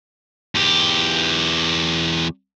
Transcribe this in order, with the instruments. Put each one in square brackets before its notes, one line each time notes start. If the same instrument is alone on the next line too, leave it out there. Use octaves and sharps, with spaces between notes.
[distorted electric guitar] E2 G4